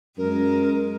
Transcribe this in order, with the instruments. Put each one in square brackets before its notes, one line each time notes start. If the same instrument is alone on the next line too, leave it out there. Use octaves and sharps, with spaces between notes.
[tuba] F#2 [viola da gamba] G#3 [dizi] A#4